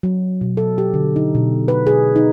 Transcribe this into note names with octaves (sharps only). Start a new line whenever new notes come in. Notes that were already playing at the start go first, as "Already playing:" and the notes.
F#3
B2
A4
G4
D3
D#4
B2
B4
G#4
D#4